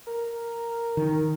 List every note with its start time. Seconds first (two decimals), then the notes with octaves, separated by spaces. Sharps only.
0.07 A#4
0.97 D#3